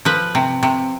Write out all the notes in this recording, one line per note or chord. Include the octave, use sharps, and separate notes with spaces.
F3 B4
C3
C3